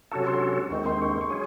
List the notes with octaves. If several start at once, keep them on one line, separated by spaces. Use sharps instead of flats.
C3 F#3 C#4 F#4 A4 A5
C6
D#2 D#3 G#3 C4 C#6
C6
C#6
C6
C#6
F#3 C#4 G#4 C6